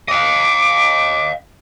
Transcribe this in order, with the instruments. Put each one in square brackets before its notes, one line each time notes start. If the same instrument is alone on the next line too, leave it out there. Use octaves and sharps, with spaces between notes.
[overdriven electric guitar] D#5 F5 [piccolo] D6